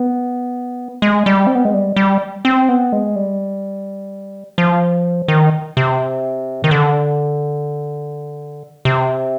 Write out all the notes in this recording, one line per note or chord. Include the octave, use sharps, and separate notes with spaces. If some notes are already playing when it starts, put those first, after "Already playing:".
Already playing: B3
G#3
G3
C4
B3
G#3
G3
G3
C4
B3
G#3
G3
F3
D#3
C3
D#3
D3
C3